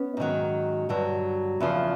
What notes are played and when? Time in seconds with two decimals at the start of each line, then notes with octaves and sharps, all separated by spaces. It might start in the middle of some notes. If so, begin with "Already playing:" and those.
Already playing: B3 C#4
0.17 G#2 D#3 F#3
0.89 G2 D3 F#3
1.60 E2 C#3 F3